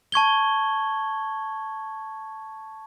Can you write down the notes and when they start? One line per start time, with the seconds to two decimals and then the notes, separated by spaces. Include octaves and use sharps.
0.12 A5 C#6 G#6 G7